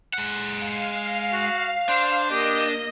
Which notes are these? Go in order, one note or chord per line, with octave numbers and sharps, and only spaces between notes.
G#3 F#5
F5
F#4
D4 C5
A#3 G4 D#5